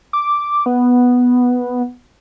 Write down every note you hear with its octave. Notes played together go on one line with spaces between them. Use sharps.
D6
B3